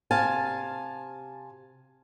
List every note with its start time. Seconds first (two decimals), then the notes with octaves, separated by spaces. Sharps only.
0.11 C3 F5 G#5 A5